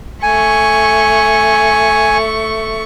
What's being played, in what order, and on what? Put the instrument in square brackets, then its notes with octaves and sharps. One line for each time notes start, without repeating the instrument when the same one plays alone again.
[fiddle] A3 C#6 [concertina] G#5